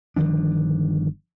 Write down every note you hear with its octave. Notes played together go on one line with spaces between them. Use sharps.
G1 D#3 F3 D4